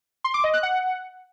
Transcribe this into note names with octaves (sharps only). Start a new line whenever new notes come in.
C6
D6
D#5
F#6
F#5